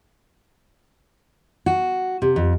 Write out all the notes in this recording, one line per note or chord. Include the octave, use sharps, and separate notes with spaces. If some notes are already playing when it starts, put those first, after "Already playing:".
F#4
C3
F2